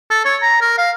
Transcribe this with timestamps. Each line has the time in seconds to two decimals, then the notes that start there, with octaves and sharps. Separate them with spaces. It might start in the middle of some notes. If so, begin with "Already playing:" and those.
0.10 A4
0.25 C#5
0.42 A#5
0.61 A#4
0.78 F5